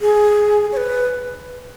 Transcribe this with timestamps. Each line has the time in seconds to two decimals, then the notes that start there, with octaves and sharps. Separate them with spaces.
0.01 G#4
0.72 C#5
0.77 B4